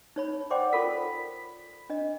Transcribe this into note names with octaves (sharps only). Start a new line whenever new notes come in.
D#4 C#5 B5
C5 D5 F#5 G5 C6 D6
F4 A4 A#4 B5 B6
D4 D#5